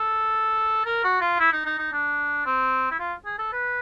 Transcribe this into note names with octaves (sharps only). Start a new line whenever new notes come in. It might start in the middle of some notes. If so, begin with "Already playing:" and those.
Already playing: A4
A#4
F#4
F4
E4
D#4
D#4
D#4
D4
C4
E4
F4
G#4
A4
B4